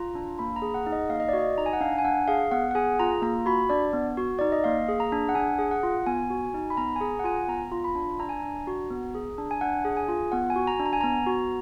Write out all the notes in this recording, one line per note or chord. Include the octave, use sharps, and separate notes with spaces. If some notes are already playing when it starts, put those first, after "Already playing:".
Already playing: F4 A#5
D4
A#3 B5
A#5
G#4
F#5
D#4
D#5
A#3 F5
D#5
D5
F#4 D#5
D#4 A#5
G#5
F#5
D4 F5
G#5
D4 F#5
G#4 F5
B3 F#5
F#5
G#4 G#5
F4 A#5
A#3 A#5
F#4 B5
D4 D5
B3
F#4
D#4 D5
D#5
A#3 F5
G#4
A#5
D4
F#5
D4 G#5
G#4
F#5
F4
B3 G#5
F#4
D#4
B5
B3 A#5
G#5
G#4 A#5
F#5
F4 G#5
B3 A#5
F4
B5
D4
D4 A#5
G#5
D4 A#5
F#4
B3
G#4
D4
G#5
D4 F#5
G#4
G#5
F4
B3 F#5
G#5
F#4
A#5
D4
A#5
G#5
B3 A#5
F#4